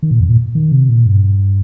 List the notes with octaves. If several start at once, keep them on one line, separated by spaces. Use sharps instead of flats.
D#3
A#2
F2
A#2
D#3
C3
A#2
G2